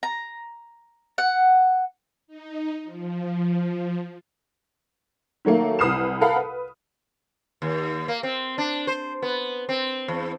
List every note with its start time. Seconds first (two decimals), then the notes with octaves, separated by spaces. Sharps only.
0.03 A#5
1.18 F#5
2.27 D#4
2.85 F3
5.45 D#3 F#3 A3 A#3
5.79 C2 B4 D#6 F6 C7 E7
6.21 A4 A#4 F5 F#5 B5
6.36 B4
7.62 D#2
8.08 A#3
8.23 C4
8.58 D4
8.87 C5
9.22 B3
9.69 C4
10.08 E2